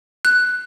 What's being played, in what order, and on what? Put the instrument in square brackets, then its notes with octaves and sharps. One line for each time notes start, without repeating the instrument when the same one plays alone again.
[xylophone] F#6